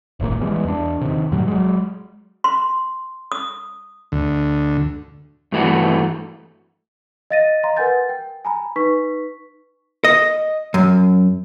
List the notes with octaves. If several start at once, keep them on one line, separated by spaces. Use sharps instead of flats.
D#1 G#1 A2 A#3
E3 G3 G#3 B3
E2 D4
C3 D#3
E2 A2 F#3 G3
F#3 G#3
C6
D#6
D2
G2 E3 A3 F#4
D#5 F5 A6 A#6 D#7
D#5 F5 A#5 C6
A#4 B4 F#5 G#5 G6 A6
G5
G#5 A#5 B5
D#4 B4 C#6 B6
D#5
F#2